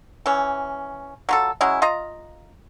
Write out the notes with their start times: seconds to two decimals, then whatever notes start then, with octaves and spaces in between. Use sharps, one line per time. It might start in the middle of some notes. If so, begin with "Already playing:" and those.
0.26 E3 C#4
1.29 F#3 F4 A4
1.61 F#3 G#3 C#4 E4
1.82 F4 D#5 A#5